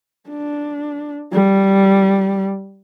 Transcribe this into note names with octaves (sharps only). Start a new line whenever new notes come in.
D4
G3